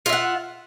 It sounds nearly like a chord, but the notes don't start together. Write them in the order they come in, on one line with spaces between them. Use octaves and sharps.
F4 E5 F#5